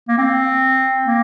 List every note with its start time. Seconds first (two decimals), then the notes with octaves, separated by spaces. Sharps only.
0.08 A#3
0.18 C4
1.06 A#3